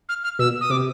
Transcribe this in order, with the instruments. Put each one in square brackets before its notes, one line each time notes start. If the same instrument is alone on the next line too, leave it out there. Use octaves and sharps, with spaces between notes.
[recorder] F6
F6
[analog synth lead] B2 [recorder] E6
[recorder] D#6
[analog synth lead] C3 [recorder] D6